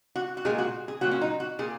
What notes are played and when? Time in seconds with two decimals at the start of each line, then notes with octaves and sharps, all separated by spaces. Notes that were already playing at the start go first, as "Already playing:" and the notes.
0.16 F#4
0.37 F#4
0.45 A#2 G#3 G#4
0.58 F#4
0.88 G#4
1.01 A#2 F#3 F#4
1.11 C#4
1.21 D#4
1.40 F#4
1.59 A#2 G#4